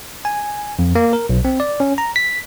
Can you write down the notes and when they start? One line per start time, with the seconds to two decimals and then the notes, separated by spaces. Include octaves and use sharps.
0.25 G#5
0.79 F2
0.95 A#3
1.13 A#4
1.29 B1
1.45 C4
1.60 D5
1.80 C#4
1.98 A#5
2.16 B6